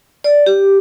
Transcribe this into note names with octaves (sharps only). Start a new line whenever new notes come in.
D5
G4